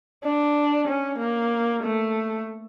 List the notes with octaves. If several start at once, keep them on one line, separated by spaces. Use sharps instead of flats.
D4
C#4
A#3
A3